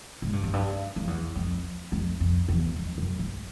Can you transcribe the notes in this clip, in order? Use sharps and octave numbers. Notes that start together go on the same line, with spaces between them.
G#2
G2
F#2
G2
F2
E2
F2
F2
F2
E2
F2
F#2
G2